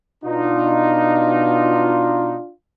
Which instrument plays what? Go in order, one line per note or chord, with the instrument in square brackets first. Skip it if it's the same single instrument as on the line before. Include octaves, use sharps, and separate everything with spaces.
[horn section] B2 D#4 [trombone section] D4 F4